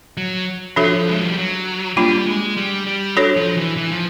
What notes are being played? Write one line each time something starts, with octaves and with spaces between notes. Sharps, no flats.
F#3
F3 D4 F#4 A4 C#5 E5
G#3
G3
F#3
G3 A#3 D4 F4
G#3
G3
G3
D4 F#4 A4 C#5
F3
E3
E3
F3